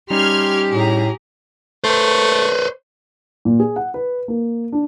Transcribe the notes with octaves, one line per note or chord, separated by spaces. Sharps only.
G3 C#4 D#4 G4 C6 F6 G#6
A2 G#4 A#5
A3 B4 C5
A#2
G#4
F#5
B4
A#3
D4